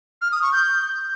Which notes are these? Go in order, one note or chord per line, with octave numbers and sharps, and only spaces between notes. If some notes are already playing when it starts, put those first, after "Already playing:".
F6
D#6
C#6
G6